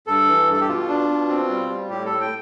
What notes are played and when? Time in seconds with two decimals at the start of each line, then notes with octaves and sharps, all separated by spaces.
0.07 G2 A4
0.28 E3
0.48 G2 A4
0.60 G4
0.68 B2 F4
0.88 D4
1.08 B2
1.29 C4
1.49 G3
1.70 G3
1.89 A2 G4
2.05 A4
2.10 A2
2.21 G5